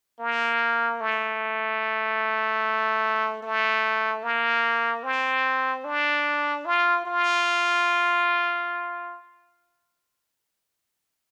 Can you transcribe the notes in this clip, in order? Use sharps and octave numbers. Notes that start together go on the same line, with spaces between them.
A#3
A3
A3
A#3
C4
D4
F4
F4